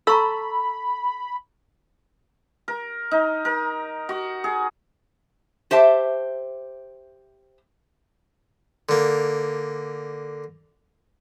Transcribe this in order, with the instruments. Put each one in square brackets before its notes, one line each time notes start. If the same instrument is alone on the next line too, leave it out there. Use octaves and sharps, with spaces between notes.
[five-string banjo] A4 [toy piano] A#5 C#6 E6 [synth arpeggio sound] B5
[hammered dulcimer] A#4
D#4
A#4
F#4
G#4
[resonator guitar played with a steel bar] G4 C5 E5 A5
[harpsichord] D3 A#3